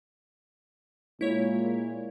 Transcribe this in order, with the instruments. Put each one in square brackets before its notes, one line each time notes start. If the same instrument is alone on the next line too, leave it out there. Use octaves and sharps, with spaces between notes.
[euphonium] A#2 [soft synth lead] G#3 [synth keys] E4 C#5